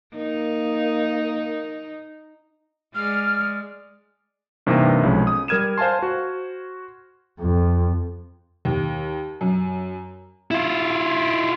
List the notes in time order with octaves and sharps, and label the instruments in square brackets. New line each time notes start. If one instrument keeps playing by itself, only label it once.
[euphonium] A#3 [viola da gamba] D#4
[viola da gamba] G#3 D5 [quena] F6
[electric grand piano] G2 C3 E3 A#3 C4 D#4
B1 F3 G#3 C#4
D#6
G3 A#4 F6 G#6 D#7 E7
C5 F5 G#5 A5 C6
F#4 C5
[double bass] F2
[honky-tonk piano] D#2
F#2
[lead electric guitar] E4 F4